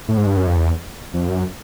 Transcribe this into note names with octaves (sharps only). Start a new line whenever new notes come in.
A2
G#2
G2
F#2
F2
E2
F2
F#2